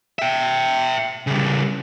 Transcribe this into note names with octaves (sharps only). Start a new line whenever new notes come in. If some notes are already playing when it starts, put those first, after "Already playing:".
E5 G5
C#3 G3